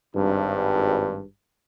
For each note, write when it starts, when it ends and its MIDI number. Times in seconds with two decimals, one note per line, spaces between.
0.15 1.22 32
0.15 1.22 43